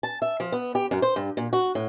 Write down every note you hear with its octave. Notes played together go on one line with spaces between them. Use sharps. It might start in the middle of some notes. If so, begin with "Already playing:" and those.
A5
E5
F3
B3
G4
F#2
C5
G2
A#2
F#4
A2